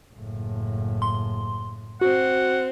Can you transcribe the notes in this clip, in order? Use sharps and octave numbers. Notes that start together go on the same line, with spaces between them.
F#1 A2
C6
C4 F#4 F#5